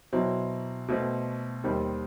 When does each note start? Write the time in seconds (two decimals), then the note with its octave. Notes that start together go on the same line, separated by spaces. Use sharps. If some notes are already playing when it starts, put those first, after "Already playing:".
0.13 B2 F#3 C4 E4
0.88 B2 A3 C4
1.64 D#2 D#3 G3 C4